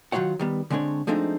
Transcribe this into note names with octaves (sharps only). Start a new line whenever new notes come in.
D#3 F#3 G#3 F4 C#5 F#5
D#3 G3 B3
D3 G#3 C4 D4 C#5
F3 G#3 A3 C4 D4 D#4